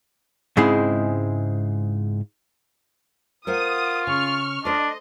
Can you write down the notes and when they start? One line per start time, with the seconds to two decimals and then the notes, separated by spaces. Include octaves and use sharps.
0.57 G#2 C#3 G#3 C4 E4 G#4
3.47 F4 A#4 C5 F#5 D#6
4.07 C#3 C#6 F6
4.65 D4 A4 C5 D#5